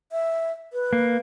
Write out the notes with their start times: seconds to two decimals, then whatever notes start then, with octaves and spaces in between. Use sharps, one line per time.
0.12 E5
0.73 B4
0.93 A#3